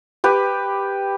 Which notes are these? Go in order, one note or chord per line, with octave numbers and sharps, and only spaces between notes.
G4 B4